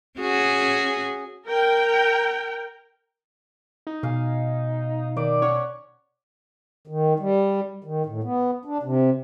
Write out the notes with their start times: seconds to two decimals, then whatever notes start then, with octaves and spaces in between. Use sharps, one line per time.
0.19 C#4 F#4 G#4
1.46 A#4 G5
3.87 D#4
4.03 B2 F5 G#5
5.17 D#3 D5
5.42 C#4 C#5 F#5
6.87 D#3
7.19 G3
7.84 D#3
8.06 A2
8.23 B3
8.65 D4
8.83 C3